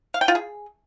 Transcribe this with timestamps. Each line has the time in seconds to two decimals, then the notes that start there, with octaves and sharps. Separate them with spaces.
0.14 F5
0.21 G5
0.28 F4
0.35 G#4